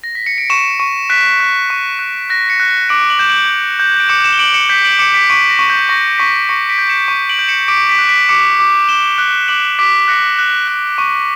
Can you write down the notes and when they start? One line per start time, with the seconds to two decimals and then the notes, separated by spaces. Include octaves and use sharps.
0.04 A#6
0.15 B6
0.26 C#7
0.38 D7
0.49 C#6 C#7 E7
0.80 C#6
1.09 F#6 B6 D7
1.40 F#6
1.70 C#6
1.99 F#6
2.30 F#6 A#6
2.49 A#6 C#7
2.60 F#6
2.70 A#6
2.89 D6 D7 F#7
3.10 D7 F#7
3.19 G6 E7
3.29 D7 F#7
3.50 G6
3.79 G6
4.00 D7
4.09 D6 C#7 E7
4.24 C#7 E7
4.33 G7
4.39 D6 D7 F#7
4.54 C#7 E7
4.69 G6 B6 D7
4.84 D7 F#7
4.99 D6 C#7 E7
5.14 B6 D7
5.30 C#6 B6 D7
5.49 A#6
5.59 C#6
5.70 G6
5.89 C#6 A#6
6.18 C#6 B6
6.48 C#6 A#6 C#7
6.69 B6 D7
6.78 G6
6.90 C#7 E7
7.08 C#6
7.29 D7 F#7
7.39 G6
7.48 C#7 E7
7.68 D6 B6 D7
7.88 B6 D7
7.99 F#6
8.09 B6 D7
8.28 D6 C#7 E7
8.59 D6
8.89 D6 E7 G7
9.18 F#6
9.48 D6 D7 F#7
9.79 D6 B6 D7
10.08 F#6 A#6 C#7
10.39 F#6
10.68 F#6
10.98 C#6